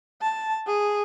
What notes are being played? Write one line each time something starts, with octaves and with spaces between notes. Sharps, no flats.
A5
G#4